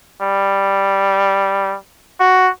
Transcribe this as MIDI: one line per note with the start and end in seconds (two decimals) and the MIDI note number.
0.21 1.76 55
2.20 2.50 66